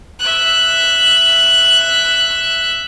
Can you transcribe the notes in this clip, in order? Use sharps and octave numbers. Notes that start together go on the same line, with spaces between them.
E5 F#6